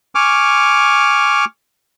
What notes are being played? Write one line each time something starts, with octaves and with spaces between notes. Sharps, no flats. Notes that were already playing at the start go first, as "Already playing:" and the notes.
G#5 C#6 D6 F6